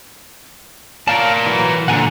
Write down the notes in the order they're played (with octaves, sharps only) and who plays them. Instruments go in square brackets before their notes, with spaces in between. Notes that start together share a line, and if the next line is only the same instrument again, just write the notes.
[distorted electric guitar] A#4 D5 [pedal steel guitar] C#5 F5 A5
[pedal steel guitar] E3 F#3
[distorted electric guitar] A#2 D3 [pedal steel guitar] F#5 G#5 A#5